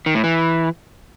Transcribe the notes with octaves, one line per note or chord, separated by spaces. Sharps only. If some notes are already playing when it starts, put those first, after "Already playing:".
D#3
A2
E3